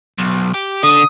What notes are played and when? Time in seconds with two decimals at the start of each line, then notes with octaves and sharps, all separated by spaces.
0.18 B1
0.54 G4
0.83 D3 D#6